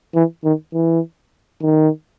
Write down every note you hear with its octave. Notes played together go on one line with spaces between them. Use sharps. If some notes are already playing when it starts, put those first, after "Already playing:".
E3
D#3
E3
D#3